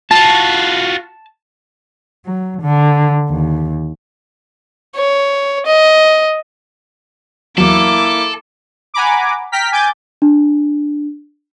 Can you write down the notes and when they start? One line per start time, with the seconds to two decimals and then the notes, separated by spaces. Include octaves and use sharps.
0.11 F4 F#4 A5
2.26 F#3
2.62 D3
3.29 D#2
4.96 C#5
5.66 D#5
7.58 E2 F#3 A#3 E4 A4 D6
8.94 F#5 G#5 A#5 B5 D6
9.52 G5 A#5 F6 B6
9.71 G#5 D6 G6 A6
10.22 D4